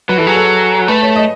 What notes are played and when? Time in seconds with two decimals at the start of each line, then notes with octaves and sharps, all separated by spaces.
0.09 F#3 B4
0.18 E3 A4
0.27 F#3 G#4
0.36 A4
0.88 A3 B4
1.02 C#5
1.16 D#5